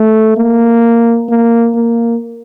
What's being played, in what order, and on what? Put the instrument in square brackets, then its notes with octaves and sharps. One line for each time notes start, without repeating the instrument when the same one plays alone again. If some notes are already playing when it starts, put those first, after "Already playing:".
Already playing: [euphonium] A3
A#3
A#3
A#3